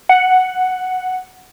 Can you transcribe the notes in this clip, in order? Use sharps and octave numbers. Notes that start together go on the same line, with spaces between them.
F#5